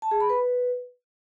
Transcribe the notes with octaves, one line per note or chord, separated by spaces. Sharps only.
A5
G#4
B5
B4